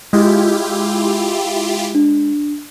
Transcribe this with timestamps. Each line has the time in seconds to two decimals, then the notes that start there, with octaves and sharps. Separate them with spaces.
0.13 G#3 E4 F4 G4
1.95 D4